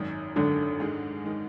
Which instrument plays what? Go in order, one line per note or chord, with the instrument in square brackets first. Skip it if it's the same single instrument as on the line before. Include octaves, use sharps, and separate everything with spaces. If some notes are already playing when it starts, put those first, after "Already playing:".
Already playing: [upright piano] G#1 F#2 D#3
[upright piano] G#1 F#2 D#3 [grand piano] D3
[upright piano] G#2 D#3 G#3
D#3 G#3